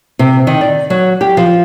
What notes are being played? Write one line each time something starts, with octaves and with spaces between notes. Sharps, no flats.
C3
D#3
D5
F#3
G4
F3